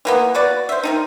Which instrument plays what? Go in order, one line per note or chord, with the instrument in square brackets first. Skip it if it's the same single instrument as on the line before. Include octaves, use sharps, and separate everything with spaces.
[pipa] E3 A#3 B3
F#4 B4 D5
C5 E5
D#3 G3 D#4